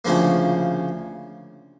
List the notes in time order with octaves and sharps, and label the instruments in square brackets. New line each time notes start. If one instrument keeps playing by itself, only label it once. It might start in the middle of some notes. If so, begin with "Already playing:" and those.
[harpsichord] D2 C#3 F3 A#3